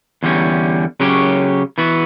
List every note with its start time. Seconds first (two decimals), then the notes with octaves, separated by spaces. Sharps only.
0.23 E2 D3 G3 C#4
1.00 C#3 F#3 C#4 G4
1.78 E3 B3 F#4